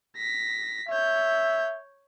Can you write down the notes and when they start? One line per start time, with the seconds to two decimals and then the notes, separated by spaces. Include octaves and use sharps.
0.17 A#6 B6
0.89 C#5 E5 G6